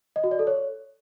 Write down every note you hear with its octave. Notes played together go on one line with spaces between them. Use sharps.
D#5
F#4
D5
A4
C#5